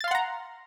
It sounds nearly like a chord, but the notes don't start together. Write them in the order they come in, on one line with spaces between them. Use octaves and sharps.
A6 F5 C6 F#5 A#5